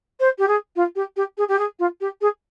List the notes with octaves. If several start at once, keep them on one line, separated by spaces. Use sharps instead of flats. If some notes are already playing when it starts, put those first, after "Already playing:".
C5
G4
G#4
F4
G4
G4
G#4
G4
G#4
F4
G4
G#4